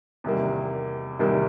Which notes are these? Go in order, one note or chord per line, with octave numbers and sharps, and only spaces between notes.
E2 C3 D#3 G3 A#3
E2 C3 D#3 G3 A#3